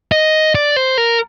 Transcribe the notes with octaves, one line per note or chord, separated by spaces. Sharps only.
D#5
D5
C5
A#4